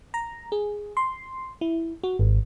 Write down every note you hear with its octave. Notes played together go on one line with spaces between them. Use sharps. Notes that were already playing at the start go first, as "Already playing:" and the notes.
A#5
G#4
C6
E4
F#4
G#1